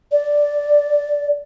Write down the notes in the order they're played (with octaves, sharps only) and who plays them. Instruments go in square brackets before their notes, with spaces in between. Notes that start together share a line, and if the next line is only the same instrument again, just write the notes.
[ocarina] D5